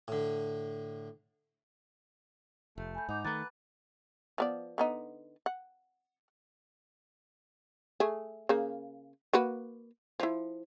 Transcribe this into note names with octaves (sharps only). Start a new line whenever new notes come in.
A2 D3
F1 A3
G#5 B5 G6
G#2 D#4 F#5 D6 G6
D#3 A3 B4 A#5 D6 A6
F3 B3 D5
D3 B3 D#4
F#5
A3 G#4
C#3 A#3
A#3 F#4 B4
F3 E4